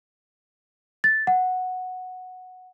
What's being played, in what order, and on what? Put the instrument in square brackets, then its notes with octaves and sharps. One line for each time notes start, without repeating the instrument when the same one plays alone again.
[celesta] A6
F#5